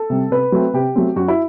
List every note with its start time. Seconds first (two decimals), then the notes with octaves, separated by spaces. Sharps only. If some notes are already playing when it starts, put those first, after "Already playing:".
Already playing: A4
0.10 C3 G3 C4
0.31 C3 B4
0.52 F#3 A3 C4
0.74 C3 G4
0.96 F#3 A3 C4
1.16 F#2 F#4
1.28 E4